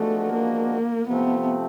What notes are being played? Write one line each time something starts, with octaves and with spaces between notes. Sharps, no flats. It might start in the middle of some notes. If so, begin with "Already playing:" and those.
Already playing: F3 G#3 A3 B3 D4 F#4
A#3
C3 F3 A3 B3 C4